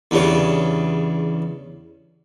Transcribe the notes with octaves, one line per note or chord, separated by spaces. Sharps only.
E2 G2 C#3